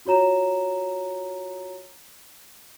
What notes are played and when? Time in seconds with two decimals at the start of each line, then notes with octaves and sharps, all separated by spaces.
0.05 F4 F#4 C#5 A#5 E7